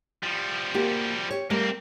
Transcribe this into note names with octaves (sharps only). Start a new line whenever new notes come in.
F3 G3
A#3 F#4 G4
G4 C#5
G3 A3 A#3 C4 A#4